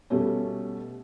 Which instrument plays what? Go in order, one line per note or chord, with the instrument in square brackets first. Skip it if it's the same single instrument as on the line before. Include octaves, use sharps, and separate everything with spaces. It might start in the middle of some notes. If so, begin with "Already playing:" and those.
[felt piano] B2 G3 A3 C#4